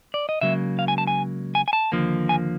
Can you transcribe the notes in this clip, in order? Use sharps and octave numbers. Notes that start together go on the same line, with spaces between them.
D5
D#5
C#2 C#3 F#3 A#3 E5
F5
G#5
A5
G#5
G#5
G#5
A5
D#2 D3 F3 A#3
G#5